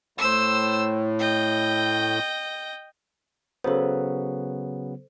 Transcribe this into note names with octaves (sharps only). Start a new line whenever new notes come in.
A2 C5 E6
D#5 G5
C#3 F#3 B3 A4 C5